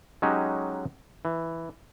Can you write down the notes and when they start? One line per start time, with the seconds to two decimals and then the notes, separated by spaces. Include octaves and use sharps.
0.22 F#3 G#3 C#4 D#4 F#4 G4
1.25 E3